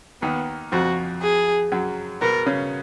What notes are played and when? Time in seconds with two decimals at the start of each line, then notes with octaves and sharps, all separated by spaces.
0.22 D#2 D#3 B3
0.72 F2 F3 F#4
1.22 G#4
1.72 F#2 F#3
2.21 B2 B3 A#4
2.46 C#3 C#4